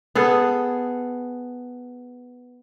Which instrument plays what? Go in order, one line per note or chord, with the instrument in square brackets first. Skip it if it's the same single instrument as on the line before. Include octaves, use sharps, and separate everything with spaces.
[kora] B3 G#4 A4